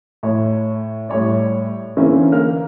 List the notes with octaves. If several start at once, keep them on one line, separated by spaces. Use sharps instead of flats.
A2 C#5
A2 G3 C#5 D5
D3 E3 A#3 C4 C#4
A#3 F6